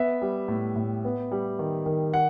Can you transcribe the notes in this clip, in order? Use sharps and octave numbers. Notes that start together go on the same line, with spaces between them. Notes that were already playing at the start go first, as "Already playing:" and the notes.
Already playing: B3 E5
G3
A2
A2
B3
G3
D#3
D#3
F#5